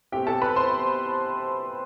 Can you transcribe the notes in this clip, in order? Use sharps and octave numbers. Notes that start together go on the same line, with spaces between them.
B2 A3 C4 G4 G5
A4 A5
B4 B5
C5 C6